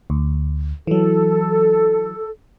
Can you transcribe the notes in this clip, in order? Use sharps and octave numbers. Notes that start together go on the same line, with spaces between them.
D2
E3 F#3 A4